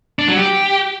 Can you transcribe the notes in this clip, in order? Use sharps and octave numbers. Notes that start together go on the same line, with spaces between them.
D4
F#3
G4